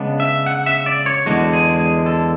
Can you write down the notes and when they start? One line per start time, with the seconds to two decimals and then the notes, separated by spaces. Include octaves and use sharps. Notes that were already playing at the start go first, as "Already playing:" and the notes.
Already playing: C#3 G#3 B3 D4
0.20 E5
0.46 F#5
0.66 E5
0.86 D5
1.06 C#5
1.26 E2 D3 G#3 D4 F#4
1.53 G#4
1.79 G#4
2.06 A4